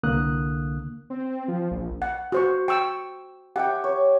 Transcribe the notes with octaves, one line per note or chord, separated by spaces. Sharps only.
C2 D3 A#3 D#6 F#6
C4
F3
A#1
F#5
F#4 C5 C#6
G5 C#6 E6
G4 E5 F#5 G5
C#5